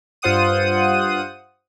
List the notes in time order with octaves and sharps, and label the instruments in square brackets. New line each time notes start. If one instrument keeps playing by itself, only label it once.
[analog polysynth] G2 F4 C5 F#5 D#6 D#7